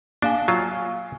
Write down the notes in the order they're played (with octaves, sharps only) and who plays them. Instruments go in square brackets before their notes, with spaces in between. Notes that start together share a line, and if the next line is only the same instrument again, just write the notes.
[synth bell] A#3 F5 G#5 [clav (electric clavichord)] D4
[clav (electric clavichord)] F#3 F4